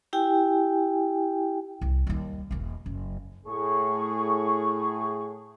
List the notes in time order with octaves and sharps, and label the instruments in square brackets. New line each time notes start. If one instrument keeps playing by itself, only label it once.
[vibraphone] E4 G4 G5 G#5
[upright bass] C2
D#2 G3
E1 A#3
F#1
[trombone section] A2 G#4 [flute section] C#6